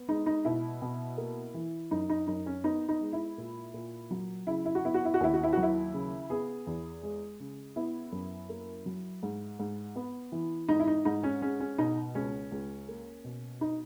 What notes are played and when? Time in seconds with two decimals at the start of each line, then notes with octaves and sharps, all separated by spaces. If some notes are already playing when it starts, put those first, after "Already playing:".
Already playing: B3
0.08 G#3 D#4
0.26 D#4
0.45 B2 E4
0.82 B2
1.18 A#3
1.54 E3
1.91 F#2 D#4
2.10 D#4
2.27 F#2 D#4
2.46 C#4
2.64 B3 D#4
2.89 D#4
3.01 G#3
3.13 E4
3.38 A#2
3.74 A#2
4.11 F#3
4.47 C#3 E4
4.65 E4
4.75 F#4
4.84 B3 E4
4.94 F#4
5.05 E4
5.14 F#4
5.20 D#2 E4
5.34 F#4
5.43 E4
5.53 F#3 F#4
5.63 E4
5.94 C#3
6.30 B3 G#4
6.67 E2
7.03 G#3
7.40 C#3
7.76 B3 E4
8.12 F#2
8.49 A#3
8.86 F#3
9.23 G#2
9.59 G#2
9.96 B3
10.32 E3
10.69 G#2 D#4
10.80 E4
10.87 D#4
11.05 G#2 D#4
11.23 C#4
11.42 G#3 C#4
11.60 C#4
11.78 B2 D#4
12.15 C#2 C#4
12.52 C#2
12.88 A#3
13.24 B2
13.61 D#4